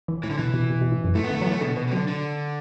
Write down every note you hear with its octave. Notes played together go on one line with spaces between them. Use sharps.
E3
A2 E3
D3
B2 E3
B2
B2
B2
A2
F#2
A2 A3
B3
D3 A3
F#3 B3
E3 A3
B2 D3
B2 E3
B2
D3 F#3
D3